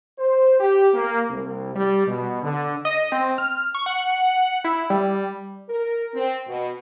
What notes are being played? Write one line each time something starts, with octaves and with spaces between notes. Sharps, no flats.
C5
G4
A#3
C2
G3
B2
D3
D#5
C4
F6
C#6
F#5
E4
G3
A#4
C4
B2